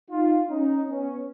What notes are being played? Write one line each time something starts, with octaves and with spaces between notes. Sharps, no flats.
D#4 F4
C#4 D#4
B3 C#4